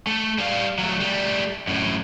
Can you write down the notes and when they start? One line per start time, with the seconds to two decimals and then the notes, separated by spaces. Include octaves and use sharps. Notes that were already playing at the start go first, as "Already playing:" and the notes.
0.07 A3
0.38 G3 F5
0.78 F#3 A3
1.00 G3 A3
1.67 F#2 A2